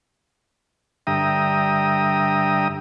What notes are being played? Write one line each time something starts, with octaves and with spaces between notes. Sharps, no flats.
G2 D3 E5 G5 A#5 D#6